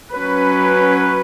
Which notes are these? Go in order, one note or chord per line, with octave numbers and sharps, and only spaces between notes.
F#3 C#4 B4